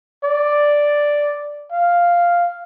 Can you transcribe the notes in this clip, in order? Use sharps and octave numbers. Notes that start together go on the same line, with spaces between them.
D5
F5